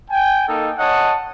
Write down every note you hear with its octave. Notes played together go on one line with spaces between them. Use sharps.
G5 G#5
A#3 D#4 A4 D#5
C#5 D#5 F#5 A5